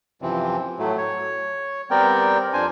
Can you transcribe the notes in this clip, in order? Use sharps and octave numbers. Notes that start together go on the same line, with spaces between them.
F#2 C3 E3 F3 C4
A2 F#3 A3
C#5
G3 B3 C4 A#4 D5 G5
F2 D4 C5 G#5